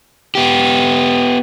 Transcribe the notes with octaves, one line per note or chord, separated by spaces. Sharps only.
B3 G4